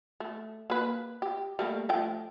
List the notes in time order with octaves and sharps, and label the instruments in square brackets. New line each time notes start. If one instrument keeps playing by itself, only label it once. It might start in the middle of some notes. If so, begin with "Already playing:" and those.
[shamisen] A3
A#3 B4
G4
G3 A3 A#3
F3 A3 G5